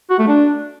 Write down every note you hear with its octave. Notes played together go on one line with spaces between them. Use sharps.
F#4
A3
D4